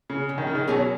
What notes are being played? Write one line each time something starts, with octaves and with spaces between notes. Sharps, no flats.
C#3
C#3
D#3
C#3
D#3
B2 F#3 C#4 G#4